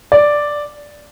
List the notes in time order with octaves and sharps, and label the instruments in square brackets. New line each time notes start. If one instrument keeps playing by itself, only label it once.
[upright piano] D5